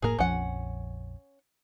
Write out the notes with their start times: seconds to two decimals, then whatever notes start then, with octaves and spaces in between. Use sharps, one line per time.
0.02 F1 A2 A#3 G#4 A#4
0.19 A#1 F2 F3 C#4 F#5